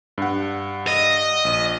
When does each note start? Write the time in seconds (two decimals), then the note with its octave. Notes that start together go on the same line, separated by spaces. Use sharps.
0.18 G2 F#5
0.87 D#5
1.45 A#1 D#7